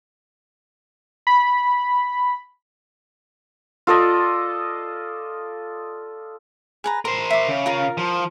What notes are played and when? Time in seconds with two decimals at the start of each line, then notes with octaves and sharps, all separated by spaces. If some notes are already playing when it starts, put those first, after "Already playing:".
1.27 B5
3.87 F4 A4 D5 D#5
6.84 G#4 B4 A#5
7.05 A#4 C5 C6
7.30 E5 D6
7.48 C#3
7.66 F4 A#4 F5
7.97 F3